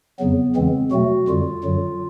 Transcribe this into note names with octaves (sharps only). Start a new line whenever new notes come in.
F2 C#3 F#3 B3
E2 C#3 E3 G#3 C4
B2 F#3 A3 F#4
F2 D3 G3 F4
F#2 D3 F#3